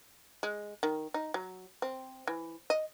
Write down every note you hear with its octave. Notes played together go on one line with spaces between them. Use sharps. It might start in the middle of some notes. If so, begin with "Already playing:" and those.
G#3
D#3
D#4
F#3
C4
E3
D#5